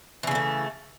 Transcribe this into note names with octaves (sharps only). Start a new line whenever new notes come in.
C#3 E3 A3 B3